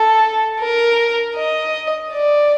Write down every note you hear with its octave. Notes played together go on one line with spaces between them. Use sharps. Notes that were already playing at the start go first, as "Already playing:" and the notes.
Already playing: A4
A#4
D#5
D5